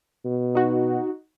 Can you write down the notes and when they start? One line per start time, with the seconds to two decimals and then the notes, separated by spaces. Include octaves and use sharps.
0.25 B2
0.55 D#4 F#4